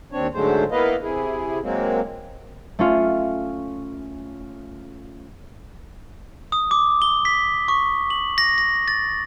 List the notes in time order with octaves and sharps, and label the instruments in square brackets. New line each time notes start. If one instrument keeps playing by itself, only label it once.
[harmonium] D#2 C4 D4 C#5
G#2 D3 F#3 G#3 A3 C5
A#3 B3 E4 B4 D#5 F5
C3 E4 G#4
F#3 G#3 A#3 C4
[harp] A3 C#4 F4
[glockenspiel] D#6
D6
G7
B6
C#6
F#7
A#6
A#6
A6